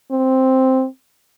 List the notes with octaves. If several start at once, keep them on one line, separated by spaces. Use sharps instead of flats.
C4